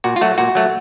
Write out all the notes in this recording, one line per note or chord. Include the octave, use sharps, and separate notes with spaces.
A#2 F#4
F4
F#3 A3 F#4
A#2 F#4
F#3 A3